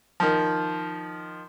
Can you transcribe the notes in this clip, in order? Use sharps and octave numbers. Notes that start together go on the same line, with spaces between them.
D#3 F3